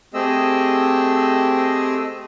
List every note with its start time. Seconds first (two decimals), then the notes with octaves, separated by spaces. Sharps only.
0.14 A3 C4 G4 G#4 D#5 E6